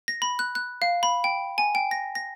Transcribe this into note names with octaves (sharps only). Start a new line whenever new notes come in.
A#6
B5
F#6
F#6
F5
B5
G5
G#5
G5
A#6
A#6